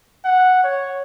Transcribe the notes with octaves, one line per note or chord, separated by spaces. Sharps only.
F#5
C#5